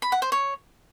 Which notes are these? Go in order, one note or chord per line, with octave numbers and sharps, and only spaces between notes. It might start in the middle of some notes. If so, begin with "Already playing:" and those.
B5
F#5
C5
C#5